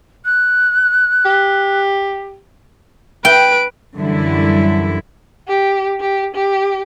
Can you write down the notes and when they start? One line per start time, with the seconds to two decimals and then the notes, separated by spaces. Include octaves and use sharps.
0.25 F#6
1.25 G4
3.25 B4 G5 D7
3.96 F#2 D3 E3 G3 E4
5.48 G4
6.00 G4
6.35 G4